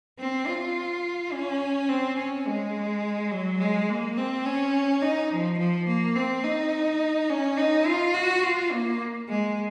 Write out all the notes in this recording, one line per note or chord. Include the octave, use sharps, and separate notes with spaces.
C4
F4
C#4
C4
C#4
G#3
F#3
G#3
A#3
C4
C#4
D#4
F3
F3
A#3
C4
D#4
C#4
D#4
F4
F#4
F4
A#3
G#3